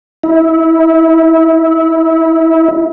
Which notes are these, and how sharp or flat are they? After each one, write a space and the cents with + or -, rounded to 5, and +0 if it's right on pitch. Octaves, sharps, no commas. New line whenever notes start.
E4 -25